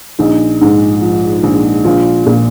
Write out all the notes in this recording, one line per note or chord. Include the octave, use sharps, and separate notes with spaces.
A#1 D#4
G#2
F3
A#1
A#1 F4
A#2